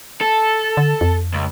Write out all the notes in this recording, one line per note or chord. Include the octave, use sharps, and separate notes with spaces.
A4
D3
F2
C#2